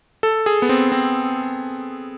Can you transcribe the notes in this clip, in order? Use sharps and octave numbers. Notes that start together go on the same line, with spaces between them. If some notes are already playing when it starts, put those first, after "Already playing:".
A4
G#4
B3
C4
C4